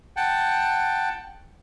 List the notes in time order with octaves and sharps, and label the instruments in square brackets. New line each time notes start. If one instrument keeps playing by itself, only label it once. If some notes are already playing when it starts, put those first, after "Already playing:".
[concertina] F#5 G5 A5